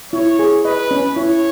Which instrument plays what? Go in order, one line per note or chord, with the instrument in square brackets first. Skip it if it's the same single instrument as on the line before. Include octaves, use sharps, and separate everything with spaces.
[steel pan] E4 [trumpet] C#5
[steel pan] G#4
[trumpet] B4 [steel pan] D#5
[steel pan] C#4
[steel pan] E4 [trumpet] C#5